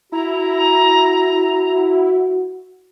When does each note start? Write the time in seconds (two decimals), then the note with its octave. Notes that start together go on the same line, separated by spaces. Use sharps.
0.12 E4 F#4 A#5